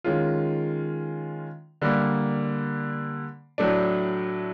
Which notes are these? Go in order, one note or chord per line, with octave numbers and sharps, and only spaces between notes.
D#3 G#3 C#4 F4
D3 G3 A#3
A2 F#3 A3 D4